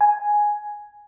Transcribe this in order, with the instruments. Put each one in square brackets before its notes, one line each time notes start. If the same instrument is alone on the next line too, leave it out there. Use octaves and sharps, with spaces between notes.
[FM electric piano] G#5